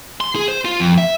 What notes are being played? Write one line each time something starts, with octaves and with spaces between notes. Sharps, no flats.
C6
G#4
C5
F4
F2
E5